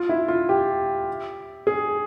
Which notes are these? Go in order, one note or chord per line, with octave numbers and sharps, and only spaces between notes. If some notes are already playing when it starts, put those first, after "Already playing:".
Already playing: F4
E4
F4
G4
G#4